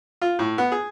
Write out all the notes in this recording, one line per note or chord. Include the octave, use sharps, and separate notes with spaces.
F4
A2
B3
G#4